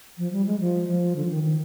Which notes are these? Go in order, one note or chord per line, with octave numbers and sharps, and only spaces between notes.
F3
G3
G#3
F3
F3
D3
F3
D#3
D#3